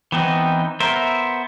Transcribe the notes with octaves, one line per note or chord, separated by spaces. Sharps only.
E3 B3 C4 D#4
B3 A#4 C5 E5